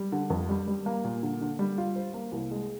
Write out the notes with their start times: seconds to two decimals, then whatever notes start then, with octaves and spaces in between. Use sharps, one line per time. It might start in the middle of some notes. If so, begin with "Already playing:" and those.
Already playing: G3
0.12 D3
0.30 F2
0.49 G3
0.68 G3
0.86 A#3
1.04 A#2
1.23 D3
1.41 D3
1.59 G3
1.78 F4
1.96 C5
2.14 A#3
2.32 C2
2.51 G#3